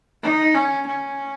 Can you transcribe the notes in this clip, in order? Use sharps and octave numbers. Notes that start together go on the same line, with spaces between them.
D#4
C#4
C#4